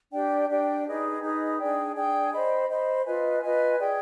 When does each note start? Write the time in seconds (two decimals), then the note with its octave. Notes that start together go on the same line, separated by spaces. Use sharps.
0.12 D4 G4 D5 G5
0.49 D4 G4 D5 G5
0.85 D#4 G#4 B4 D#5
1.22 D#4 G#4 B4 D#5
1.59 D4 G#4 D5 G5
1.95 D4 G#4 D5 G5
2.32 C5 D#5 B5
2.68 C5 D#5 B5
3.05 F4 B4 D#5 G#5
3.41 F4 B4 D#5 G#5
3.78 G#4 D5 G5